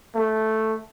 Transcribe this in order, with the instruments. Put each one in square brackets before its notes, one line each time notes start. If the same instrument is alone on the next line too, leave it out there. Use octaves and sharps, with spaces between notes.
[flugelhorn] A3